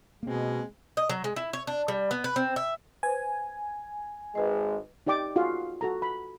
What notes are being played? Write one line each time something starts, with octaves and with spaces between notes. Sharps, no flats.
B2 G#3 A#3 C4
D#5
F#3
G#3
E4
C#5
D4
G3
B3
B4
C4
E5
B4 C5 G#5
G#1 G#3 B4 D#5
D#4 G4 D5 G5 D6
F4 F#4 G#4 F5
F#4 A4 A#5
B5